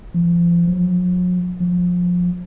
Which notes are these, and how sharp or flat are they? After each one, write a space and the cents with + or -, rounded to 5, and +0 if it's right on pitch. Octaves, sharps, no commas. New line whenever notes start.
F3 -30
F#3 -45
F3 +25